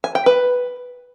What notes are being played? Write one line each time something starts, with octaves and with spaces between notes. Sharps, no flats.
G#5
G5
B4